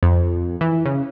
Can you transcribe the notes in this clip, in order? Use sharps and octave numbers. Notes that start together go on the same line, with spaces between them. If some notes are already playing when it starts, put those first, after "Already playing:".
F2
E3
C#3